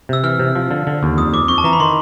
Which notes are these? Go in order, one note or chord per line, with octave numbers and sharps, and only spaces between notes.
C3 E6
E3 F6
C3
F3
D3
D3
D#2
F2 D#6
F2 D6
F2 C#6
A5
E3 A#5
B5
D#3 C6